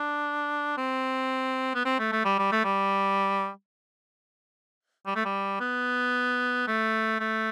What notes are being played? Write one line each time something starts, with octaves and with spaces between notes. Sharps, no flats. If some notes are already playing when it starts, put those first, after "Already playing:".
Already playing: D4
C4
B3
C4
A3
A3
G3
G3
A3
G3
G3
A3
G3
B3
A3
A3